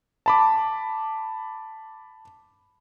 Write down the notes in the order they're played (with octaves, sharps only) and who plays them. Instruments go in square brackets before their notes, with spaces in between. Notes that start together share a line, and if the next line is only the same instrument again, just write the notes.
[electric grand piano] A5 B5 D6